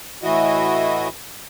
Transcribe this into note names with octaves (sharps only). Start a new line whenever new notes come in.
A2 E3 E4 F#4 D#5